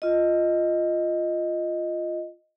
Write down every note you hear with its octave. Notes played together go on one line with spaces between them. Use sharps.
F4 D#5